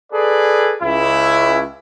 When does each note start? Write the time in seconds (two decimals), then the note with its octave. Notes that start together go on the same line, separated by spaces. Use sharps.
0.13 G#4 A4 B4 D5
0.83 C#2 E4